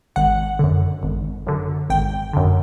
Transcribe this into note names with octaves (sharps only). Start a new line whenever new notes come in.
G#1 F#5
F#2 D3
G#1
F#2 D3
G#1 G5
F#2 D3